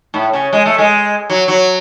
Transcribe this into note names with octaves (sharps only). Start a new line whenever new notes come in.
A2
C#3
G#3
A3
G#3
F#3
F#3